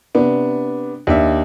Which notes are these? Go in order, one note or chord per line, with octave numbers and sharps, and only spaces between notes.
C3 B3 D4
D#2 D4 E5